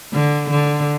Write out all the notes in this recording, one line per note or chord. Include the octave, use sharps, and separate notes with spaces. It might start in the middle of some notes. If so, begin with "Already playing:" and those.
D3
D3